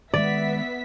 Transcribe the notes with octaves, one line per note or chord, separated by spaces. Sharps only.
D#3 G#3 B3 D5 E5 B6